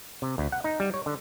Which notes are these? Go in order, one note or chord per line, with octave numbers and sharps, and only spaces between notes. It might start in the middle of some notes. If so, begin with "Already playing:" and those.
C3
D2
F#5
D#4
G3
C#5
D3